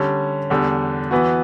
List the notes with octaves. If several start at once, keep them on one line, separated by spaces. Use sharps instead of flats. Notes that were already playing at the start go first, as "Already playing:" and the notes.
Already playing: D3 G3 C#4
E2 D3 G3
E3 B3 F#4